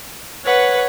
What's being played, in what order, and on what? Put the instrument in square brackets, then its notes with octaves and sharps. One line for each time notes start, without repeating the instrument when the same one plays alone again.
[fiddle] B4 [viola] C#5 F#5